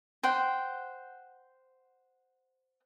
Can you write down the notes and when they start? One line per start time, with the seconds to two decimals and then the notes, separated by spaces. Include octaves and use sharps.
0.23 C5 F#5 G5